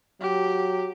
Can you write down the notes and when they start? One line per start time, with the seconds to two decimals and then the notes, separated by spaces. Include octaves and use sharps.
0.21 F#3 G4